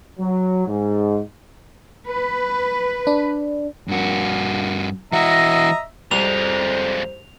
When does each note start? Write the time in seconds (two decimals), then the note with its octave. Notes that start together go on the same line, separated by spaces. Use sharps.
0.19 F#3
0.68 G#2
2.07 B4
3.07 D4
3.88 G2 A#3 D4 F#4
5.12 E3 F#4 D#5 E5 A#5
6.11 C2 F2 F3 G3 G#3 C5 F7